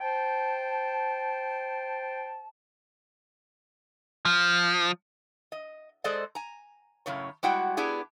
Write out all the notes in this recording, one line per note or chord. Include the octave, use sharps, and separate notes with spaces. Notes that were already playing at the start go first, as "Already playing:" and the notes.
C5 G5 A5
F3
D#5
G#3 G#4 A4 C5 D5 D#5
G#5 A#5
F#2 A2 C#3 C#5
G3 G#3 E4 F#4 F#5 G5
B3 D4 E4 G4 G#4